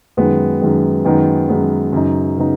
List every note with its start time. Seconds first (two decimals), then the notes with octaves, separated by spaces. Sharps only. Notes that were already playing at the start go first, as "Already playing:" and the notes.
0.17 F#2 D#3 G#3 B3
0.61 F#2 D#3 G#3 B3
1.05 F#2 D#3 G#3 B3 D#4
1.49 F#2 D#3 G#3 B3 D#4
1.93 F#2 C#3 B3 D#4
2.38 C#3 B3 D#4